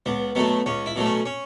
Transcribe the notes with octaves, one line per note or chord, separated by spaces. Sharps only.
C#2 B3
B2 F#3 A3 B3
C#2 C#4
E4
B2 F#3 A3
C#4
C#4